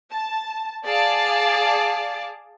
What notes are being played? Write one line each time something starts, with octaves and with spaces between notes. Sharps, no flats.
A5
G#4 D5 F5 A5 D6